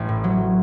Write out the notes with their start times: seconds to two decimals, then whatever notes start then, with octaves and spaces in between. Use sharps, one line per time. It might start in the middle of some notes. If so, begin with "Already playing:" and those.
Already playing: A1
0.09 A2
0.24 F#3